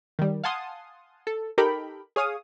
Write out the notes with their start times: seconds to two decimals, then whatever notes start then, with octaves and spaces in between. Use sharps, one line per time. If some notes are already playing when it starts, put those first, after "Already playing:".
0.19 D#3 G3
0.44 F5 F#5 G#5 A5 C6 D#6
1.27 A4
1.58 D#4 G4 A4 A#4 G5 B5
2.16 G#4 C#5 F5 D#6